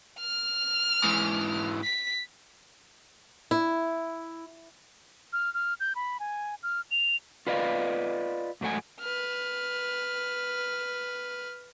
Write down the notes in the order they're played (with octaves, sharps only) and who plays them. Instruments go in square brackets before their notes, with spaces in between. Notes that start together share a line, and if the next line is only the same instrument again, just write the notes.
[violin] F6
[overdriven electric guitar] G#2 E3
[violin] B6
[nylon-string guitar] E4
[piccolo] F6
F6
G6
B5
G#5
F6
F7
[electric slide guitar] F4 B4 D5 D#5 F5
G#2 F#3 A3 F#5 G#5
[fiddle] B4 F6